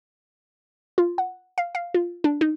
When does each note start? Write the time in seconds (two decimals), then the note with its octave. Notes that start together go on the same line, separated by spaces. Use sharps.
0.98 F4
1.18 F#5
1.58 F5
1.75 F5
1.94 F4
2.24 D4
2.41 D#4